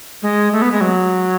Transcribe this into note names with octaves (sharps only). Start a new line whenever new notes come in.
G#3
A3
B3
G#3
F#3